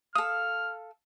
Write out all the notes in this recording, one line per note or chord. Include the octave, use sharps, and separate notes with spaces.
A4 F5 D#6 F6